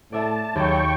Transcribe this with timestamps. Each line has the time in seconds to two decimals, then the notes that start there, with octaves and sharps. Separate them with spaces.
0.12 A2 D5 E5 A5
0.55 D#2 F#3 G5 C#6